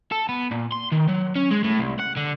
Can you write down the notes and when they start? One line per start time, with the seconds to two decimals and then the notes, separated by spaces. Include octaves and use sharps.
0.11 A4
0.29 B3
0.52 A#2
0.72 C6
0.92 D#3
1.08 F#3
1.36 C#4
1.51 G#3
1.64 A2
1.79 C2
2.00 F#5
2.17 D3